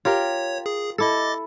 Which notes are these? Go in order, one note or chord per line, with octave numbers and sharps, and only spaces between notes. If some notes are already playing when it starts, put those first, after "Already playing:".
F4 G4 A#4 C#5
G#4
E4 A4 D#5 D6 A6